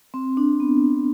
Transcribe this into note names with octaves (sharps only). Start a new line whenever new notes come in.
C4
D4
B3